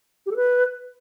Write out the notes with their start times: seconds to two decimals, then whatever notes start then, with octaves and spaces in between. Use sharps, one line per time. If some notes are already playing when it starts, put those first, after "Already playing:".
0.26 G4
0.31 A4
0.36 B4